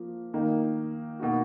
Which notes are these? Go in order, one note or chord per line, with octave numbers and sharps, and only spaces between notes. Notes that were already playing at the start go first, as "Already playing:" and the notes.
Already playing: F3 A#3
D#3 A#3 D#4
B2 A#3 D#4 F#4